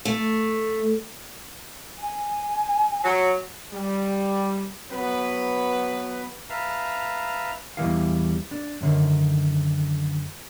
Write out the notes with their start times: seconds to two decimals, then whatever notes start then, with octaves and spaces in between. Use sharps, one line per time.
0.05 A3
1.98 G#5
3.04 F#3
3.72 G3
4.90 F#3 B3 B4
6.50 B4 E5 F5 A5 A#5
7.77 E2 C3 E3 G3 E4 F5
8.51 D4
8.81 F#2 D3 D#3